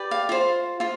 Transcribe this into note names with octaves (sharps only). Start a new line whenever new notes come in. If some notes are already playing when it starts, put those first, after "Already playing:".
Already playing: G4 B4 D5
F5
F4 C5
F4 C5